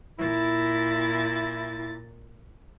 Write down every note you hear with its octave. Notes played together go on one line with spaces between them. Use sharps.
A#2 E4 A6